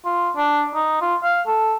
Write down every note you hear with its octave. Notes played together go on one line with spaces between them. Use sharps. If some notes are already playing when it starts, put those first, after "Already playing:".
F4
D4
D#4
F4
F5
A4